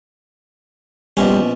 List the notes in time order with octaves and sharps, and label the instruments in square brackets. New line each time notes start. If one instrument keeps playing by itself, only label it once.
[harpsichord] A#1 B2 C#4 [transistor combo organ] G3